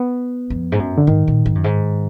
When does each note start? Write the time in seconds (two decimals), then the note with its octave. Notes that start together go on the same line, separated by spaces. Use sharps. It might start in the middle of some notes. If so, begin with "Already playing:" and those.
Already playing: B3
0.50 F2
0.72 G#2
0.79 F#2
0.98 D3
1.07 G#2 D#3
1.28 A#2
1.46 G#2
1.55 F#2
1.64 G#2